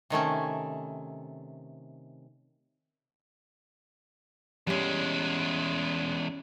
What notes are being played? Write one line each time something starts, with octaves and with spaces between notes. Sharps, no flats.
C3 D#3 A3 C#4
E2 G3 G#3 C#4